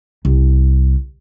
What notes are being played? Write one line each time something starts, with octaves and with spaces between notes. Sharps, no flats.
C2